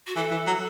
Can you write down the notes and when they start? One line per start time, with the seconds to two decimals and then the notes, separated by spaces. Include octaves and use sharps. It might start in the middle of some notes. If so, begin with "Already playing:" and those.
0.07 F#4
0.16 E3 A4
0.31 E3
0.47 F#3